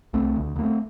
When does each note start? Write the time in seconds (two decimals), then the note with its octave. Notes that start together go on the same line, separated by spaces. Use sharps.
0.13 C2 A3 C4
0.36 D2
0.56 D2
0.59 A#3
0.63 A3 C4